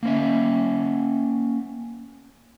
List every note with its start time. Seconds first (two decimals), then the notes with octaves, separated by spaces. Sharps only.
0.03 A#3 C#4 E5